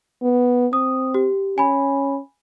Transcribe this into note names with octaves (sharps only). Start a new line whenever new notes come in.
B3
C4 D#6
G4
C#4 G#5 B5